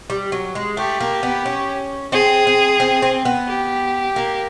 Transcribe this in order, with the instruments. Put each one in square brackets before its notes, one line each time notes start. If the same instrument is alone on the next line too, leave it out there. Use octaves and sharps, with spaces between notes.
[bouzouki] G3
F#3
G#3
[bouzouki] A3 [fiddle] G4
[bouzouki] A#3
B3
C#4
[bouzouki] C4 [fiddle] G#4
[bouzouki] C4
C4
C4
B3
[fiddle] G4
[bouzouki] A#3